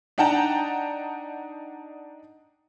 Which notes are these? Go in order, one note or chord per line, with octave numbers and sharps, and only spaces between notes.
D4 D#4 F#5 G5 A5 A#5